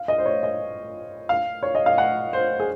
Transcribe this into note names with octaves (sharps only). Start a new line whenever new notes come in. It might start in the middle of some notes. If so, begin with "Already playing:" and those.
Already playing: F5
D#5
C5
C#5
D#5
F5
C#5
D#5
F5
F#5
C5
G#4